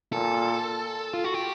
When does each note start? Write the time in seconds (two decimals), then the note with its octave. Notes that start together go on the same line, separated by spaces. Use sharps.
0.13 A#2 A4
1.13 F4
1.24 F#4
1.34 G4